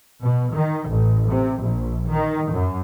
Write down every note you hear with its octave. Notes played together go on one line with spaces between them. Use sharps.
B2
D#3
A1
C3
A#1
D#3
F#2